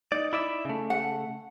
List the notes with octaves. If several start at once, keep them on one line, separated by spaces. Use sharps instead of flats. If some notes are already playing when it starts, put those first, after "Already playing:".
D#4 D5
E4 D5 E5
C#3 A3
F#5